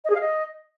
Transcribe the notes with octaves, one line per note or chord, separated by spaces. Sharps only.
D#5
G#4
F5
D#5